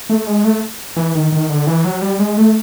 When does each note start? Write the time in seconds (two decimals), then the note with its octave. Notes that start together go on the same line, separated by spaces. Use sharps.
0.10 A3
0.27 G#3
0.44 A3
0.97 E3
1.15 D#3
1.32 D#3
1.50 D3
1.67 E3
1.85 F#3
2.02 G3
2.19 G#3
2.37 A3